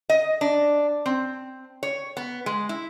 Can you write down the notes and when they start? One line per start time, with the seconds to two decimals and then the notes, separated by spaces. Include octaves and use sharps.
0.09 D#5
0.41 D4
1.06 C4
1.83 C#5
2.17 B3
2.46 G#3
2.69 E4